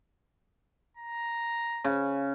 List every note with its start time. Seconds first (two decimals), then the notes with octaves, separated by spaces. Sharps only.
0.97 A#5
1.84 C#3